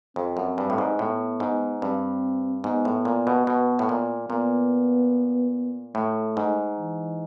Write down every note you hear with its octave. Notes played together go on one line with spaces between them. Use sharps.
F2 C4
F#2
G2
A2
G#2
A2 B3
G#2
G2 C4
G#2 B3
A2
A#2
B2
B2
A2
A#2
A#2 B3
A2 A3
G#2
E3